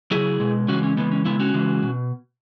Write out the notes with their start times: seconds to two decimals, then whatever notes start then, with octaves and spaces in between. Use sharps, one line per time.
0.11 C#3 F#3 E4 G#4
0.40 B2 G#3
0.68 C#3 E3 G#3 C#4 F#4
0.83 C#4
0.97 C#3 E3 G#3 B3
1.12 C#4
1.25 C#3 G#3 B3 E4
1.40 C#4 F#4
1.54 C#3 E3 G#3
1.82 B2